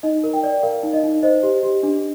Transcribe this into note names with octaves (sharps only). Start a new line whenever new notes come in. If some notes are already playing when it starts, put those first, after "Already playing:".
D#4 D#5
A#4
G5
D5
A#4 F5
D#4
D#5
D#4
C5 D#5
G4
G4
D4